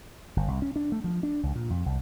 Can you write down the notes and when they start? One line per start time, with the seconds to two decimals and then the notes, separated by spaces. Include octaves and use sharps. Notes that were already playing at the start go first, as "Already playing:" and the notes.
0.36 G1
0.48 C2
0.62 C#4
0.76 D4
0.92 A3
1.04 F3
1.23 D4
1.43 C#2
1.55 A#2
1.70 F2
1.86 C2